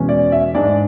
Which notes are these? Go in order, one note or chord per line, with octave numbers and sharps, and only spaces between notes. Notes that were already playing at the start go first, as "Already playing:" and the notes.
Already playing: E2 B2 G#3 C#4
D5
E5
G#2 G#3 D4 D5